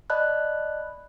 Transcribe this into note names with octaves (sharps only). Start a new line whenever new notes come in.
D5 D#5 A5 B5 F#6